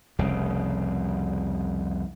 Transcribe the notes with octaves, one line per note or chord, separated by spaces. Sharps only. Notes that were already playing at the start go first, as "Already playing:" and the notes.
F1 C2 C#3